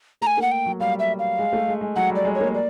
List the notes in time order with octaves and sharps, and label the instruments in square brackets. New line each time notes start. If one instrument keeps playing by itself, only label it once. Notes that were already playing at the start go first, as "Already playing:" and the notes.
[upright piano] A3 [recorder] A#5
[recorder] G#5
[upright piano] A#3 [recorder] F#5
[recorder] G5
[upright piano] F#3
[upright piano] G3 [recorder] F5
[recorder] E5
F5
[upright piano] G#3
A3
G#3
G#3
[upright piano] F#3 [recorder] F#5
[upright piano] G3
[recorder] D5
[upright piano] G#3
[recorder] C#5
[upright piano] A#3
[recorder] D5